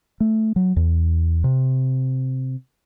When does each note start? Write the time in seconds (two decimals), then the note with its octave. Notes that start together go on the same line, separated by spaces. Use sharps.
0.20 A3
0.56 F#3
0.76 E2
1.44 C3